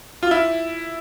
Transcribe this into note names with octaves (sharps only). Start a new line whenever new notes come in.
F4
E4